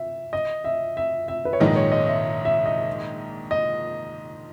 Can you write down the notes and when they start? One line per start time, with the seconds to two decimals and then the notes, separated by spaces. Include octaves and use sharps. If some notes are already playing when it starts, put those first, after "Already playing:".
Already playing: E5
0.33 D#5
0.64 E5
0.97 E5
1.28 E5
1.45 B4
1.53 C#5
1.60 A#1 G#2 D#3 G#3 D#4 D#5
1.76 C#5
1.92 D#5
2.08 E5
2.45 E5
2.66 D#5
3.51 D#5